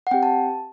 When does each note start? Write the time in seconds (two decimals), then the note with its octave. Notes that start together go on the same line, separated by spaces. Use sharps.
0.07 F#5
0.11 C4 G4 G5
0.23 A5